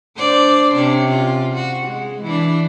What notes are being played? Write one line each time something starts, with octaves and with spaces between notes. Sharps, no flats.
D4 C5 D5
C3 C#4 D4
F4
F#4
G#3
E3 D4